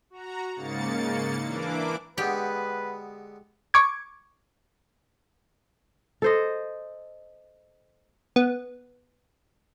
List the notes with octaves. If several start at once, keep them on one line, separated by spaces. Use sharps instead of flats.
F#4 A#5
G#2 C#3 A#3 A6 C#7
E3 A#3 D4 E4 D6
D3 G#3 B3 G4 B4
C#6 D6 G#6
A4 C5 D#5
B3